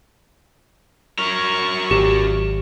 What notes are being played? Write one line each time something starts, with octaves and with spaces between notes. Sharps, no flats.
F#3 A#4 C#6
G#1 G4